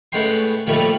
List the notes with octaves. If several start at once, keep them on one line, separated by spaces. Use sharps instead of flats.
A2 G#3 B3 C#4 G5 C6
A#2 D#3 F3 G3 A3